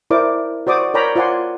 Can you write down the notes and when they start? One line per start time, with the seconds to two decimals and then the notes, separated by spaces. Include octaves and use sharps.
0.10 E4 A#4 C5 D5 D6
0.67 F#4 C5 D5 D6 D#6
0.94 A#4 C#5 D5 G5 A#5 B5
1.16 F4 C5 D5 F#5 G#5 C6